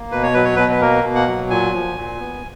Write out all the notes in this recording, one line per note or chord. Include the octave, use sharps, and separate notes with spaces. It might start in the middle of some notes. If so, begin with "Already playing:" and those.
Already playing: A#3
B2 B4
C#5
F#3 B4
C#5
B2 B4
B4
A#3 A#4
B2
F#5
F#3
A#2 G#5
F3
A#2
B3